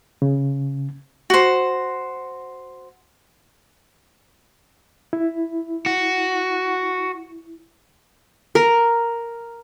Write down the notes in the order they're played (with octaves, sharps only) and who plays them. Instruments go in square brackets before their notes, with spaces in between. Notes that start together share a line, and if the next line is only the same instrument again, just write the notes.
[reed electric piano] C#3
[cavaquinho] F#4 C5
[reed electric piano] E4
[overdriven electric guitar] F#4
[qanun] A#4